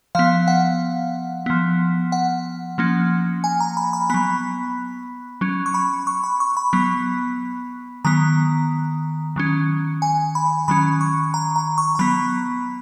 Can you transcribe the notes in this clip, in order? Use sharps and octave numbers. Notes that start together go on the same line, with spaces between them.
F3 B3 F5
F#5
F3 B3
F#5
F3 A#3 C#4
G#5
A#5
B5
B5
F#3 B3 B5
F#3 C#4
C#6
B5
C#6
B5
C#6
B5
F#3 B3
D#3 F#3 B3 A#5
D#3 F#3 C#4
G#5
B5
D#3 F#3 C#4 B5
C#6
A#5
A#5
C#6
A#5
F#3 B3 B5